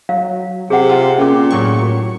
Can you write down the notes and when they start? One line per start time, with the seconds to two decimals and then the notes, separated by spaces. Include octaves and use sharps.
0.09 F#3 F5
0.70 C3 G#4 F#5
0.90 F4
1.18 A#2 C#4 G#4 D6
1.51 A2 F#3 C#6